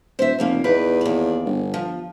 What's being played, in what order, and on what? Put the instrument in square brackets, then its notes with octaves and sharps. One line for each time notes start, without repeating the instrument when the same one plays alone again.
[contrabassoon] D#1 [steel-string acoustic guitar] C5 E5
[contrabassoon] F1 [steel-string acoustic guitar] C#3 F3 A#3
[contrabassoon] E2 [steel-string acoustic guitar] D#4 B4 D5
[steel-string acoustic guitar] D#2 D5
[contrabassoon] G1
[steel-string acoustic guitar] F3